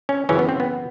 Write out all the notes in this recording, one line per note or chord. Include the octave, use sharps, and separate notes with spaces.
C#4
F#2 C#3 E3 C#4
B3
C4
B3